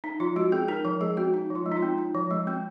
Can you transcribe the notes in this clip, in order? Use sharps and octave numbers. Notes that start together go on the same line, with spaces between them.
D#4
F3 F4
G#3 F#4
C4 G#4
D#4 A#4
F3 A#4
G#3 G#4
C4 F#4
D#4
F3
F4
G#3
D#4
F4
C4
D#4
F3
G#3
C4